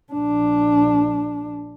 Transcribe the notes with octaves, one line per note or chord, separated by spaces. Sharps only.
A#1 D4